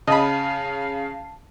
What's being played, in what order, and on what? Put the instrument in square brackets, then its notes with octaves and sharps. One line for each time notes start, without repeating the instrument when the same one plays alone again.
[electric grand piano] C#3 [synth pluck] D#5 B5 [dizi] F5 [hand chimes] A5